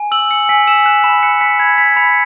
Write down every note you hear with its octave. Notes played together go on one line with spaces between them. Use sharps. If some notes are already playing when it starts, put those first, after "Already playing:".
Already playing: G#5
E6 F#7
E6 C#7
G#5 B6
E6 E7
F#6 E7
B5 E7
F#6 C#7
B5 B6
B5 G#6
B5 B6
B5 C#7